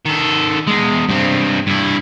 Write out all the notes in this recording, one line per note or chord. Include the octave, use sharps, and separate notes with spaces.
D#3 A4
E2 G#3
G2 C4
G2 E4